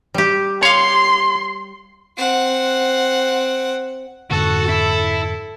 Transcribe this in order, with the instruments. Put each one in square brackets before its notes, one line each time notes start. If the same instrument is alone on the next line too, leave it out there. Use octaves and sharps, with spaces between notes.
[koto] G3 G4
[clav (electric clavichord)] C#5 F5 [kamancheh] C6
[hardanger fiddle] C4 F#5
[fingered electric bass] F2 G#2 D3 [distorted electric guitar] F#4 [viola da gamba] A4
[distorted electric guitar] E4